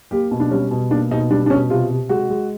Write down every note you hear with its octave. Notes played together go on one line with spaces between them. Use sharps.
A#3 G4
B2
D4
G3 C#4
B2
A#3 D4
B2 D#4
G3 D4
D4
B2 C#4
C3 F4
C3
G#3 F#4
G#3